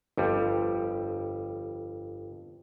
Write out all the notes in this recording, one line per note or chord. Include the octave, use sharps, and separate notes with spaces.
G1 F2 G3